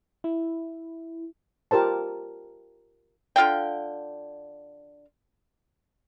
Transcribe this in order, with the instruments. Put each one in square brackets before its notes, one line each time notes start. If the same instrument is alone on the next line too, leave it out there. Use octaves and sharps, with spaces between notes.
[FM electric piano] E4
[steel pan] F4 G4 A#4 C5 A5
[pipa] D3 F4 F5 G5